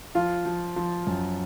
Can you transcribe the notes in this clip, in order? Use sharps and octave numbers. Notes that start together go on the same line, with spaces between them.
F3 F4
F3
F3
F#2